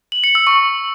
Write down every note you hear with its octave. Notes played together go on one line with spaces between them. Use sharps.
F#7
C#7
E6
C#6